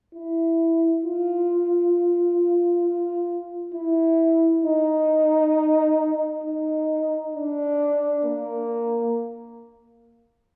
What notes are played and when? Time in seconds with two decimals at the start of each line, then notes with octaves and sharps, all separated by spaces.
0.15 E4
1.05 F4
3.74 E4
4.64 D#4
6.44 D#4
7.35 D4
8.25 A#3